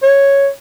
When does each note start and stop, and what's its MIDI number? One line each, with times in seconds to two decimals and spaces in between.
0.03 0.48 73